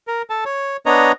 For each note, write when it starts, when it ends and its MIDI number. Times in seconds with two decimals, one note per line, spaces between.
0.07 0.22 70
0.30 0.44 69
0.30 0.44 81
0.45 0.77 73
0.86 1.12 59
0.86 1.12 62
0.86 1.12 73
0.86 1.12 75
0.86 1.12 82